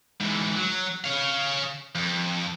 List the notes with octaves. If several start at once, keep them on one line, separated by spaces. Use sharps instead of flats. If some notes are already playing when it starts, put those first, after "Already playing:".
G#2 E3
F#3
C#5 F5
F2